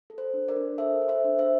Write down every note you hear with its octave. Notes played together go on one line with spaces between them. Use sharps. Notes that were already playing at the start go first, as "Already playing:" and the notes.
A4
C5
D4
A#4 D5
D4
A4 C5 E5
A4
C5 E5
D4
C5 E5